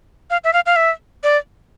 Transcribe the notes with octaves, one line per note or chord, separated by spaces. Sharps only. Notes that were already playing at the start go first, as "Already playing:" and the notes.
F5
E5
F5
F5
E5
D5